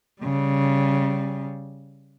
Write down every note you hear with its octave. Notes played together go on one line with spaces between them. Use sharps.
C#3 G3